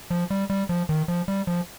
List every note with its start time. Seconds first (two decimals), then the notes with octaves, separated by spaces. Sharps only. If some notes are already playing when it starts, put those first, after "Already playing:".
0.11 F3
0.30 G3
0.50 G3
0.69 F3
0.89 D#3
1.08 F3
1.28 G3
1.47 F3